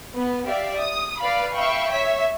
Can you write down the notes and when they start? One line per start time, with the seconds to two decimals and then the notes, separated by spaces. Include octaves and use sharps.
0.16 B3
0.46 G4 D5 E5 F5
0.78 D#6
1.21 B4 D5 F5 B5
1.55 E5 F5 G5 B5 C#6
1.90 C#5 E5 B6